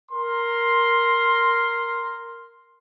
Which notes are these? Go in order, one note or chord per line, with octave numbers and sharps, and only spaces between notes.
A#4 C6